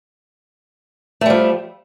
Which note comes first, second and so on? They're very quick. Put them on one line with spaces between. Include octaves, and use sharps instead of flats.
A3 G3 F3